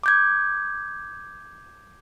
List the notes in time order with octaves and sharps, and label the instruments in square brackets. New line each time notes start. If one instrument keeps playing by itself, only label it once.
[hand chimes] D6 G6 G#6